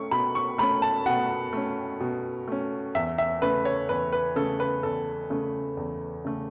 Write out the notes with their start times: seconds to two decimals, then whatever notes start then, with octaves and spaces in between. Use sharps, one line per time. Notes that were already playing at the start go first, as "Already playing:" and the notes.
Already playing: A3 C#4 C#6
0.11 B2 B5
0.35 C#6
0.58 A3 B5
0.63 C#4
0.82 A5
1.06 B2 F#5
1.53 A3 C#4
2.00 B2
2.47 A3 C#4
2.95 E2 E5
3.18 E5
3.42 C#3 A3 B4
3.65 C#5
3.89 E2 B4
4.12 B4
4.36 C#3 A3 A4
4.60 B4
4.83 E2 A4
5.30 C#3 A3
5.77 E2
6.25 C#3 A3